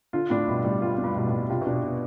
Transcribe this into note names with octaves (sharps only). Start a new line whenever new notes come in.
D3 F4
A2 D4
G2 B2
A2 G3
G2 F4
D4
G2
G2 B2
A2
G3
C3 F4
B2 D4
C3
B2